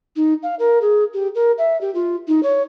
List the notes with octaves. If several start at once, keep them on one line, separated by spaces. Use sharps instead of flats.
D#4
F5
A#4
G#4
G4
A#4
E5
G4
F4
D#4
C#5